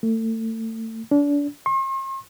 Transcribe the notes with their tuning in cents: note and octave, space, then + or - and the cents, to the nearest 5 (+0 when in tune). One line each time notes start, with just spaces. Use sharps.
A3 +30
D4 -30
C6 +45